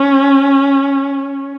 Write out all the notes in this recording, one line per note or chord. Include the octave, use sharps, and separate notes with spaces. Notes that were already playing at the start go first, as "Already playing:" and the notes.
Already playing: C#4